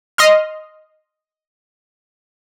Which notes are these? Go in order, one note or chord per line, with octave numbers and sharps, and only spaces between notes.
D#5 C6 F6